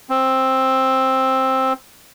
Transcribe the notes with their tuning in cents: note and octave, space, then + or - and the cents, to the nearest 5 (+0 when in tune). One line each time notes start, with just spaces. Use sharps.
C4 +10